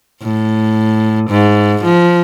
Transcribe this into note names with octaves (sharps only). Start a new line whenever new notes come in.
A2
G#2
F3